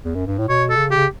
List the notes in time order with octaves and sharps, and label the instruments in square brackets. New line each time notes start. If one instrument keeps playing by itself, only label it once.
[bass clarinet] E2
F#2
G2
A2
[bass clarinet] B2 [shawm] C#5
[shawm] A4
[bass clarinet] C#3
[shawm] G4
[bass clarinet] C#3